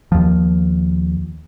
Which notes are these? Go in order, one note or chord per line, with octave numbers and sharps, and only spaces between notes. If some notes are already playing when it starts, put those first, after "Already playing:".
D#2 F3